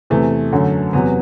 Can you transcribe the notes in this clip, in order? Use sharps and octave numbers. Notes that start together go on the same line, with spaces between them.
E2 C3 E3 A3
F#2 D3 F#3
E2 C3 F#3 B3